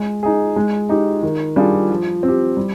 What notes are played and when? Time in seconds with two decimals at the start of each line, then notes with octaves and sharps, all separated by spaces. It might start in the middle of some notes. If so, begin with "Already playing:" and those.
Already playing: G#3
0.23 D#4 G#4
0.56 G#3
0.89 D#4 G4
1.23 D#3
1.56 G3 D4 F4 G#4
1.90 F3
2.23 C4
2.28 G4
2.57 G3